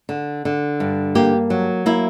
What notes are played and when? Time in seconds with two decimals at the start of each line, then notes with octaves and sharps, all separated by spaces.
0.09 D3
0.45 D3
0.80 G2
1.15 A#3 G4
1.50 F#3
1.86 A#3 E4